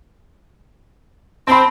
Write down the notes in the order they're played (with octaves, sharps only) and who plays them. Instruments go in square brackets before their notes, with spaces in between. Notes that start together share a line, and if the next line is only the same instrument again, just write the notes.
[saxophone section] C4 [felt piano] A5 B5